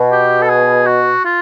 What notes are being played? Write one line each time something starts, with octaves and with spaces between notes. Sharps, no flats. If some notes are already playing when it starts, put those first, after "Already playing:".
Already playing: B2
G4
A4
G#4
F#4
F4